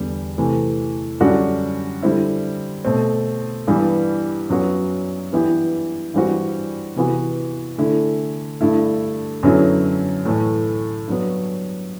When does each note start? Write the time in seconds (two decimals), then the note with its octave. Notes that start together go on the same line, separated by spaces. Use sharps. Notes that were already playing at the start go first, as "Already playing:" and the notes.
Already playing: E2 D3 G3 B3
0.38 C3 E3 A3
1.20 F#2 D3 G3 D4 F#4
2.02 D3 G3 C4 E4
2.85 B2 A3 C4
3.67 G2 E3 G3 B3
4.50 F#2 F#3 B3 F#4
5.32 G2 E3 B3 E4 G4
6.14 G2 E3 G3 C4 F#4
6.96 C3 E3 B3 F#4
7.78 D3 A3 E4
8.61 G2 D3 A3 E4
9.43 F#2 D3 F#3 B3 E4
10.25 A2 E3 A3
11.07 G2 F#3 B3